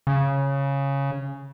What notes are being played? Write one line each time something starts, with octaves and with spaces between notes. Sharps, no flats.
C#3